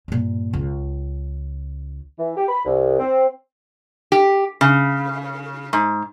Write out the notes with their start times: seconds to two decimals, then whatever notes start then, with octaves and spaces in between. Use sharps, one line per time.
0.08 G2 A#2
0.53 C#2
2.18 E3
2.36 G4
2.48 B5
2.64 C2
2.99 C4
4.12 G4
4.61 C#3
5.73 G#2